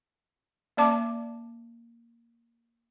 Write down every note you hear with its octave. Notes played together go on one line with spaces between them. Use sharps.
A#3 C#4 D5 A5 D6